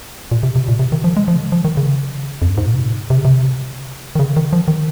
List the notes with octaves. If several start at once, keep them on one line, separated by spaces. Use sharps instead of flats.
A#2
C3
C3
A#2
C3
D#3
F3
G#3
F3
C#3
D#3
F3
D#3
C#3
F2
G2
G#2
A#2
C3
G#2
A#2
C3
C#3
C3
D#3
C#3
D#3
F3
D#3